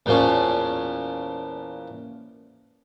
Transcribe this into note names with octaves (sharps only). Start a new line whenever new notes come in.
E2 A#2 F3 C#4